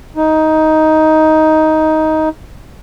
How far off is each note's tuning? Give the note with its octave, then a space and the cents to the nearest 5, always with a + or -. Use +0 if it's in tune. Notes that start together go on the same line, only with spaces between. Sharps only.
D#4 +10